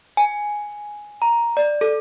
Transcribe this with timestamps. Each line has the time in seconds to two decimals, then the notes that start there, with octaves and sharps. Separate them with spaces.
0.17 G#5
1.22 A#5
1.57 D5
1.81 A4